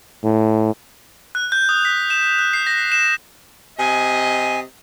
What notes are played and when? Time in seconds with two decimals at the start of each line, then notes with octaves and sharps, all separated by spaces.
0.24 A2
1.35 F#6
1.52 G6
1.69 D#6
1.85 B6
2.10 E7
2.39 F#6
2.53 C7
2.67 A#6
2.92 E7
3.79 C3 D#5 G#5